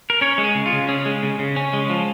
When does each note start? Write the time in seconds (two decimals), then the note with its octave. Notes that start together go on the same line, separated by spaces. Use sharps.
0.10 A#4
0.21 C#4 C#5
0.38 G#3
0.44 G#4
0.55 C#3
0.66 F4
0.72 C#3
0.89 C#4 G#4
1.06 G#3
1.23 C#3
1.39 C#3
1.56 C#4
1.73 G#3
1.89 F3